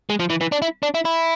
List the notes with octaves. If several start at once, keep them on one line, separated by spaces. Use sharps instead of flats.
G#3
F3
E3
E3
D4
E4
D4
E4
E4